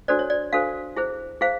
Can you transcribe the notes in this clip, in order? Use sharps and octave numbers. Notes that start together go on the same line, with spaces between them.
D4 F#4 A4 C5 D5
C#5
D5
D4 F#4 A4 C5 F5
E4 G#4 C5
E4 G#4 C5 F5